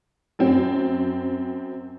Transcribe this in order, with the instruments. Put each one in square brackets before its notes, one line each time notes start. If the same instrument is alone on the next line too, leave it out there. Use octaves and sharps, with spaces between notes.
[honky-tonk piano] F#2 C4